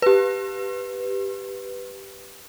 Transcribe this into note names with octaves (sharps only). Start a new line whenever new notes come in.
G4 B4